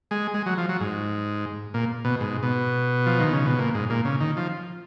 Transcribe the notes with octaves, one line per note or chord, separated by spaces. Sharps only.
G#3
G#3
F#3
F3
F#3
G#2
A#2
B2
G#2
B2
F3
D#3
C#3
B2
A#2
G#2
A#2
C#3
D#3
F3